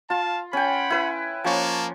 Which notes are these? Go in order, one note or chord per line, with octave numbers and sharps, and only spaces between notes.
F4 F5 A5
C#4 F#5 G5 B5
E4 B4
F3 A#3 C#4 A5 C#6